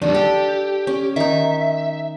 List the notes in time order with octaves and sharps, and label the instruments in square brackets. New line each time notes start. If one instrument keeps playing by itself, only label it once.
[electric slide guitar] E2 D#3 G3 [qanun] D4
[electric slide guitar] G4 [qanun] A4
[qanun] C#4
[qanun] D#3 D#4 [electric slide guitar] E5